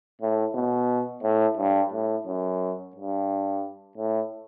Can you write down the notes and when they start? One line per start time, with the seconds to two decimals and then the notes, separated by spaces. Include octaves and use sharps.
0.22 A2
0.55 B2
1.23 A2
1.57 G2
1.93 A2
2.27 F#2
2.96 G2
3.97 A2